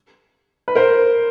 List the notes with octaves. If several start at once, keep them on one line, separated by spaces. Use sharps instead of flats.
B4
A#4 C5